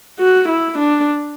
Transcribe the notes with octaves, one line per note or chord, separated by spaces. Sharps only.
F#4
E4
D4